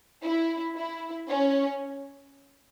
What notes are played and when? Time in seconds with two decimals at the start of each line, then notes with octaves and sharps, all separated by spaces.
0.24 E4
0.76 E4
1.29 C#4